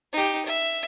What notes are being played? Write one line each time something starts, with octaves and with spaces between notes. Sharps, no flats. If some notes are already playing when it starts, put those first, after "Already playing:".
D#4 G4
E5